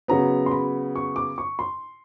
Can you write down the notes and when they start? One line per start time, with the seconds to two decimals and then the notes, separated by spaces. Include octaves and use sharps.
0.08 C#3 F#3 B3 A#5
0.46 C6
0.51 B5
0.96 C#6
1.16 D6
1.38 C#6
1.59 C6